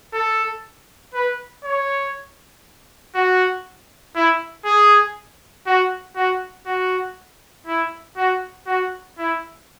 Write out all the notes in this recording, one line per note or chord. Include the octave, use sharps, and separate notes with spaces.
A4
B4
C#5
F#4
E4
G#4
F#4
F#4
F#4
E4
F#4
F#4
E4